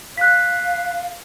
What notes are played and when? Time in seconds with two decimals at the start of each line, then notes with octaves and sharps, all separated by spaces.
0.17 F5 F#6 B6